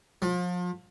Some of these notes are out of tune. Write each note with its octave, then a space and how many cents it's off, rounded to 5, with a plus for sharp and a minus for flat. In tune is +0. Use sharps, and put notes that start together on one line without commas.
F3 +35